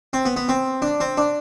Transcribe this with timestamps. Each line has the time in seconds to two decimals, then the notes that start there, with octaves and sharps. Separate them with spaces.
0.13 C4
0.25 B3
0.36 B3
0.49 C4
0.82 D4
1.00 C4
1.17 D4